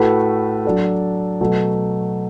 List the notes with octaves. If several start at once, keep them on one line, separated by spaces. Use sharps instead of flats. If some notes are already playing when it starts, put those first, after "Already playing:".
Already playing: A2 A3 F#4 B4
F#3 D4 A4
B2 F#3 A3